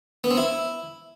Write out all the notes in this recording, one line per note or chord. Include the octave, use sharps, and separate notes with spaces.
B3
C4
E4